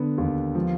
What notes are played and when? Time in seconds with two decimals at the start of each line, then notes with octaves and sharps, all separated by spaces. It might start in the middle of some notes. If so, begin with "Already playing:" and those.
Already playing: D3 B3
0.18 D#2
0.55 F3